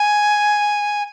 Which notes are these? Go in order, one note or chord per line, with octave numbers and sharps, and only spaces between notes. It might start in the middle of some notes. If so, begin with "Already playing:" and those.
Already playing: G#5